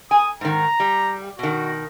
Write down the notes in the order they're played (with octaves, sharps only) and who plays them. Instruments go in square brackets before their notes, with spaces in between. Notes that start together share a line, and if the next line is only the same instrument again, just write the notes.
[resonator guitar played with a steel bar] G#5 [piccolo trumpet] D#6
[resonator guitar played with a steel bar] G#2 D#3 [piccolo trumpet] A#5
[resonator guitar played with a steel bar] G3
[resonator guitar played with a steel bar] B2 D#3 [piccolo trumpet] F#4